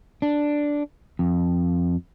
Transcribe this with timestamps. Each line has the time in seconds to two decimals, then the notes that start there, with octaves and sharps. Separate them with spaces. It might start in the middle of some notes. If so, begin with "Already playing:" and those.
0.22 D4
1.19 F2